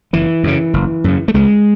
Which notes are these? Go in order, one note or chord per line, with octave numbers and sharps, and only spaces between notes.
F#1 E3
F#2 C#3
F#1
F#2 C#3
A3
C#2 G#3